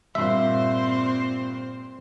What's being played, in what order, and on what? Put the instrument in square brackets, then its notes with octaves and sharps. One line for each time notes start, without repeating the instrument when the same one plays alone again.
[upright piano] G2 A#2 [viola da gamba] C4 C5 [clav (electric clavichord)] E5